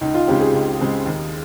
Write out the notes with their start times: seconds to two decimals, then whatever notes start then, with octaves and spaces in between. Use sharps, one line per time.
0.01 C#2 D#4
0.14 F4
0.27 C#3 G#3 C4 G4
0.41 G#4
0.54 C#2
0.79 C#3 G#3 C4
1.06 D#2